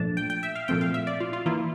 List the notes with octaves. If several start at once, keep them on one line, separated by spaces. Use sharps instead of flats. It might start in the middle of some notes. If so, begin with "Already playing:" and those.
Already playing: A#2 F3 A3 D4 A5
G5
G5
E5
F5
A#2 F3 A3 C4 G5
F5
E5
D5
F4
F4
E3 A#3 E4 F4